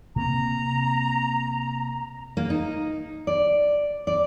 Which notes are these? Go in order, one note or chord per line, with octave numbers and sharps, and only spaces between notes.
C3 A#3 C4 A#5
A#3
D#4
D5
D5